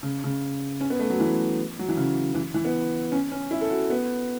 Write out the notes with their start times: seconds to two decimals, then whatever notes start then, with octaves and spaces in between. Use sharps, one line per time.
0.03 C#3
0.24 C#3
0.81 C#4
0.90 B3
0.99 A3
1.10 F#3
1.20 E3
1.79 F#3
1.88 E3
1.97 C#3
2.34 E3
2.54 E3
2.65 B3
3.12 C#4
3.32 C#4
3.51 E4
3.61 A4
3.70 F#4
3.90 B3